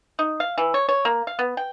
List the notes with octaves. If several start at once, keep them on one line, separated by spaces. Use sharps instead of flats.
D#4
F5
E3
C#5
C#5
A#3
F5
B3
G5